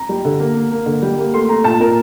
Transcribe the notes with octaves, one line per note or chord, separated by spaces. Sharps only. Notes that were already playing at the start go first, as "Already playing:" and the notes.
Already playing: A#5
G3
D3
A#3
A#3
A#3
D3
G3
A#3
A3 C6
A3 A#5
A#2 A5
A#2 A#4